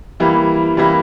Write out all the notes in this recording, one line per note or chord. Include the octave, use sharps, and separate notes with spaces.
E3 G3 A#3 E4
E3 G3 A#3 E4